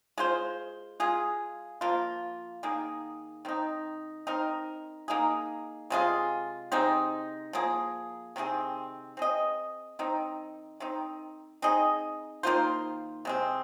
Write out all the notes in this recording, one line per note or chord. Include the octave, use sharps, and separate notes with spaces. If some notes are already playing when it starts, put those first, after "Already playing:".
G#3 F4 C5
G#3 F4 G#4
F3 A#3 F4
D#3 A#3 G#4
D#3 C4 D#4
C4 D#4 A#4
A#3 D#4 G#4
C3 G#3 F4 G#4
C3 G#3 C4 D#4
F3 A#3 G#4
C3 D#3 C4 G#4
C4 G#4 D#5
D#3 C4 D#4
D#3 C4 D#4
C4 D#4 G#4 D#5
D#3 A#3 F4 C5
C3 G#3 C4